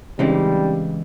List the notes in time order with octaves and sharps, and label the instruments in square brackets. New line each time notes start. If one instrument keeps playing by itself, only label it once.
[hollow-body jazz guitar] C#3 E3 G#3 [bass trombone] G3 [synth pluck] C4 C#4 D#4